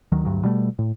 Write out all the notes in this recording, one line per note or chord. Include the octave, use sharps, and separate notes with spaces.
D2 D#3 F#3
D2 G2 F#3
B2 G3 A3
A2